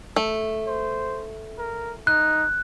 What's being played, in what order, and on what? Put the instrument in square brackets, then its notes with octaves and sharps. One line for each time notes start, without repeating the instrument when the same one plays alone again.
[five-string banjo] A3
[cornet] C5
A#4
[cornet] D#4 [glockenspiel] F#6